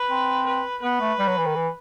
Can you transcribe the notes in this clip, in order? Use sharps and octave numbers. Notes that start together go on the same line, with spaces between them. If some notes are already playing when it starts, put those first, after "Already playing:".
Already playing: B4
C4
B4
B3 B4
A3
G3
F#3
E3
D#3
E3